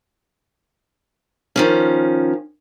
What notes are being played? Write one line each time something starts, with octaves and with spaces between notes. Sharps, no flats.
D#3 F3 C#4